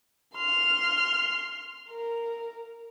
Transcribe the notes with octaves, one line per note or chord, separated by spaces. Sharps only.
C6 F6
A#4